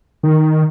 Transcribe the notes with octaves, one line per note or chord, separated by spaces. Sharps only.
D#3